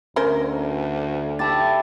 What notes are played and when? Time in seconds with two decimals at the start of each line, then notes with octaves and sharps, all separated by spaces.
0.16 D2 C#4 A#4 C5
1.39 E4 G4 E5 A5 A6